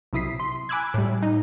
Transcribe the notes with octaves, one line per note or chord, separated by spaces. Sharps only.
B1 C3 E4 D#6 B6 C7
C6
G#5 B5 D6 E6 F#6 G#6
A2 G3
D#4